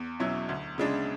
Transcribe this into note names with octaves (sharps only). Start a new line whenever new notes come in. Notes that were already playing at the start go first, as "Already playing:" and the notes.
Already playing: E2
B2 F#3 C#4 E4
D2
C#3 G#3 D4